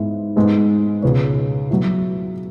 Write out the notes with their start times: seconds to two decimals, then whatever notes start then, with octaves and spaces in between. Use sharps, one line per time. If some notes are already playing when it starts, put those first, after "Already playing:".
Already playing: G#2 G#3 B3 E4
0.36 G#2 G#3 B3
1.02 C#2 B2 B3 G#4 C#5
1.70 F#3 B3 E4